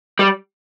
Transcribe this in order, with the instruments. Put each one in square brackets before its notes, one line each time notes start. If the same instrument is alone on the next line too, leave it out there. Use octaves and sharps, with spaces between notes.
[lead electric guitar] G3